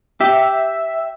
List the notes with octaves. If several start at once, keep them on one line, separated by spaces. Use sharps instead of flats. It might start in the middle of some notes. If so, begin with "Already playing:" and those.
G4 E5